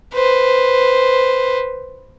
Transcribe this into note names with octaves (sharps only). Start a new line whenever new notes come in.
B4 C5